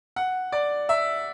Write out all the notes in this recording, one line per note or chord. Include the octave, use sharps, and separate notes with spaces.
F#5
D5
E5